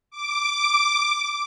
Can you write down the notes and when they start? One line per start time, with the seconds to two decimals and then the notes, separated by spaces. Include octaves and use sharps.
0.11 D6